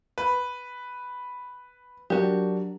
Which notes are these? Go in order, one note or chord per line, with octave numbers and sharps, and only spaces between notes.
B4
F#3 D4 F#4 G4 A#4